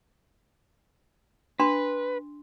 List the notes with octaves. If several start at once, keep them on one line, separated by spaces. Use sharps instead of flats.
D4 B4 C6